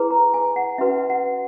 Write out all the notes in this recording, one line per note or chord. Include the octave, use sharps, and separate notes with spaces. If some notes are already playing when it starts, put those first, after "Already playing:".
Already playing: E4 G#4 B4
A#5
G#5
F#5
C#4 F#4 B4 E5
F#5